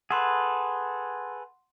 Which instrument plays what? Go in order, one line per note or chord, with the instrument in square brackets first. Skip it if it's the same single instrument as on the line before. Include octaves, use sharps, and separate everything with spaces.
[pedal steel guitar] G#4 A4 B4 [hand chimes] F#5 C6